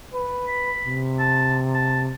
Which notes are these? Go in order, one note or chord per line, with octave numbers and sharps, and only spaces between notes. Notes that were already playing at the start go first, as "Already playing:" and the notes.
B4
B5
C3
A5
A5